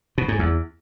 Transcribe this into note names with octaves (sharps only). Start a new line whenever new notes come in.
B2
G#2
E2